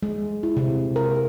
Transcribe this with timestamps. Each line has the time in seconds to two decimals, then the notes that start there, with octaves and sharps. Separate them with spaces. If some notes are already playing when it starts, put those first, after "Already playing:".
0.03 G#3
0.43 E4
0.57 C3
0.96 A#4